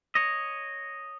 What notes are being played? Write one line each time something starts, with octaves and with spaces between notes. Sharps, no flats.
C#5 D#5